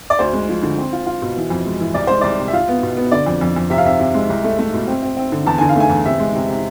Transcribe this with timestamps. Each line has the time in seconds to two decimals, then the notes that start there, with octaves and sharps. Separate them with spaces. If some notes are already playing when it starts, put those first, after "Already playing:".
0.10 D5
0.19 D2 C5
0.33 G#3
0.49 F3
0.63 D3
0.78 C4
0.93 F4
1.07 F4
1.22 B2
1.37 E3
1.50 F2
1.66 G#3
1.80 E3
1.94 C2 D5
2.07 G#3 C5
2.21 C2 D5
2.39 C3
2.48 E5
2.53 F4 F5
2.68 B3
2.83 B2
2.97 B3
3.11 D3 D5
3.26 F2
3.41 F2
3.56 F2
3.70 C3 E5
3.78 F5
3.85 C3 E5
3.99 C3
4.14 G#3
4.30 C2
4.44 A3
4.59 A3
4.74 B2
4.87 C4
5.03 C4
5.17 C4
5.32 D3
5.47 E2 A5
5.58 D3 G#5
5.69 F5
5.76 A3 G#5
5.90 E2
6.06 C3 E5
6.19 G#3
6.35 C3
6.49 C3